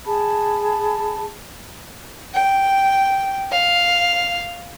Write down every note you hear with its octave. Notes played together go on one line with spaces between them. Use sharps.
G#4 A5 B5
G5
F5